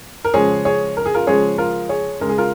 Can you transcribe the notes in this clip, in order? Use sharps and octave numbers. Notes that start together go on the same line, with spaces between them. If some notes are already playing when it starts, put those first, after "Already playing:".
A#4
C#3 F3 G#3 G#4 C#5
G#4 C#5
A#4
G#4
F4 A#4
C#3 F3 G#3 G#4 C#5
F4 A#4
G#4 C#5
C#3 G#3 A#4
G#4
F4 A#4